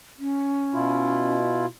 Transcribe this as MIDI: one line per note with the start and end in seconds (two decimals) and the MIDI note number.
0.19 1.35 61
0.74 1.66 47
0.74 1.66 64
0.74 1.66 65